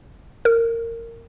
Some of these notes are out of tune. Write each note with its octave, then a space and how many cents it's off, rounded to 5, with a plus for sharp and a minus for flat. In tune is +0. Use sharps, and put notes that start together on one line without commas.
A#4 -20